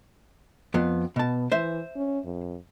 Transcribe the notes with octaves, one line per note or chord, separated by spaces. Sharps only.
F2 B3
B2 B3 A5
E3 C5 E5
C#4
F2